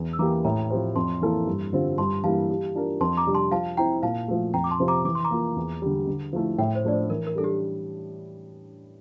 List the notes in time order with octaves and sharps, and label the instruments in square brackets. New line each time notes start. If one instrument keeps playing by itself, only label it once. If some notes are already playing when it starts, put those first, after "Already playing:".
Already playing: [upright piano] E2
[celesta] E6
[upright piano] E3 A#3 E4 G4 [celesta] A#5 D6
[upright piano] A2 [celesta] G5 A#5
[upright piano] F3 C4 G4 C5
[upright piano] F2 [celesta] A5 C6
[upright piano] E3 A#3 E4 A4
G2
D3 G3 C4 F4
[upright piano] G2 [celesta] A5 C6
[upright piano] E3 G3 A#3 E4 [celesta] F5 A5
[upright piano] G3
D4 F4 A#4
[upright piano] F2 [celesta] A5 C6
[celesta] A#5 D6
[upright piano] C3 G3 D4
[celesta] A5 C6
[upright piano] F3 [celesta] F5 A5
[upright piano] C4 E4 [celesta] G5 A#5
[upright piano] A#2 [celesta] F5 A5
[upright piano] F3 A3
[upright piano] F2 [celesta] G5 A#5
[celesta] D6
A5 C6
[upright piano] C3 F3 C4
[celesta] A#5 D6
[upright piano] E3 [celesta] D6
[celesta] C6
A#5 D6
[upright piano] A#3 F4
E2
D3 G3
D3
F3 A3 E4
[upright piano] A2 [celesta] E5 G5
[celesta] C5
[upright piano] F3 A3 D4 [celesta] D5
[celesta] C5
[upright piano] E3 [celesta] A#4
[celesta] A#4
[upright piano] G3 D4 [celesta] A4
[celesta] G4